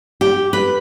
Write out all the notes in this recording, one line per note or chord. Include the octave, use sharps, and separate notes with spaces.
G4
B4